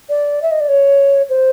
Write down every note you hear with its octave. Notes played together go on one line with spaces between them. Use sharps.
D5
E5
D#5
D5
C#5
C5